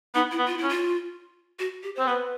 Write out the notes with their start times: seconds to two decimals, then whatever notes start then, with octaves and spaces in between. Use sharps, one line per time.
0.15 B3 D#4
0.31 E4
0.38 B3
0.47 F4
0.58 E4
0.63 C#4
0.69 F4
1.59 F#4
1.83 G4
1.96 C4 C5
2.07 B3 B4